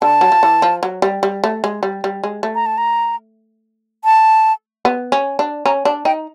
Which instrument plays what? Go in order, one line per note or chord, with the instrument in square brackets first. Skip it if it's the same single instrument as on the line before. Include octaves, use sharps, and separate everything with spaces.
[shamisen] D3 [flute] A5
[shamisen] F#3
F3
E3
F3
F#3
G3
G3
A3
G#3
G3
G3
G#3
A3
[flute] A#5
A5
A#5
A5
[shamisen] B3
C#4
D4
[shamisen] C#4 [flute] A#5
[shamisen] D4 [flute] A5
[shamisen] D#4 [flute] G5